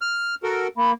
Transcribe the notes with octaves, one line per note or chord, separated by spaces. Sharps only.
F6
F#4 A4 A#4
A#3 B5